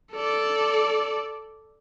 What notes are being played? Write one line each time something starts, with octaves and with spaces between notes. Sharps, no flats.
A4 D5